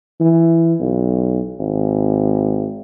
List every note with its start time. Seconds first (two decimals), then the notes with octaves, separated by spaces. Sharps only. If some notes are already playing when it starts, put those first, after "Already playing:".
0.21 E3
0.81 B1
1.60 G#1